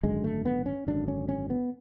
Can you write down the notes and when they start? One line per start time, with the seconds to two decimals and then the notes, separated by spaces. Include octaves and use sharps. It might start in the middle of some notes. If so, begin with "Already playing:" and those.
0.03 G#1 F#2 D3 G#3
0.24 A3
0.45 B3
0.66 C#4
0.87 G#1 F#2 D3 D4
1.08 C#4
1.29 C#4
1.50 B3